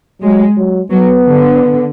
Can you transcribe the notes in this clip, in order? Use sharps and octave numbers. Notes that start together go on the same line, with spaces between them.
F#3 G#3
F#3
F#3 B3
D3